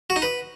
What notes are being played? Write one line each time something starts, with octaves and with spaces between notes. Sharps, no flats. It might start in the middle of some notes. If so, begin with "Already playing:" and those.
F#4
D#4
B4